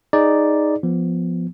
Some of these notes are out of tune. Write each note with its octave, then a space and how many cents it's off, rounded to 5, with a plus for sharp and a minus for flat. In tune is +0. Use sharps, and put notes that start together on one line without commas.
D#4 +0 G#4 +0 D5 +0
F3 +0 B3 +0